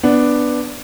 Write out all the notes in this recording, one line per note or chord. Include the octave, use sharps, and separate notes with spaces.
B3 D4